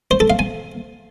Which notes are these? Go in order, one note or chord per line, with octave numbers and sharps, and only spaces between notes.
C5
A4
F5
G#5